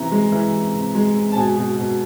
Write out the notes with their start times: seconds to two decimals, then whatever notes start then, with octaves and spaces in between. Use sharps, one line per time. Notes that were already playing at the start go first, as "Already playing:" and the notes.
Already playing: C3 E3 A#5
0.12 G#3
0.32 E3
0.53 C3
0.74 C3
0.95 G#3
1.16 C3
1.32 A5
1.37 B2 G#5
1.57 B2
1.78 B2